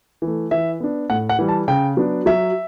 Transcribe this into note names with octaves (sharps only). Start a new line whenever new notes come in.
E3
A3
E3 E5
B3 D4
A2 F#5
F#5
E3 G3
A5
C#3 G5
F#3 B3 D4
F#3 E5